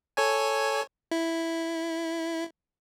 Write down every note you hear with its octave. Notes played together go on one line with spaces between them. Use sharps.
A4 C#5 G#5
E4